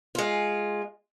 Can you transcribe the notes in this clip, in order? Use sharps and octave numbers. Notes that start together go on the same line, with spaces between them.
G#3 F4